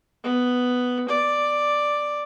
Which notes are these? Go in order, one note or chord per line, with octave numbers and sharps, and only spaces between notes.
B3
D5